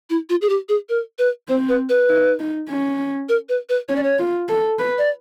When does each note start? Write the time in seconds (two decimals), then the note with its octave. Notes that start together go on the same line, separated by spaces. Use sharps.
0.10 E4
0.30 F4
0.42 G#4
0.49 G4
0.69 G#4
0.89 A#4
1.19 B4
1.49 C4 C5
1.69 B4
1.89 B4
2.09 D#4
2.39 D#4
2.69 C#4
3.29 A#4
3.49 B4
3.69 B4
3.88 C#4 C#5
3.96 D5
4.03 C#5
4.19 F4
4.49 A4
4.79 B4
4.98 D5